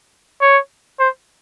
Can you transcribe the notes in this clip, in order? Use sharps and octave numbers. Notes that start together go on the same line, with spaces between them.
C#5
C5